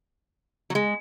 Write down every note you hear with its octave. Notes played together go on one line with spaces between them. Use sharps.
F#3
G#3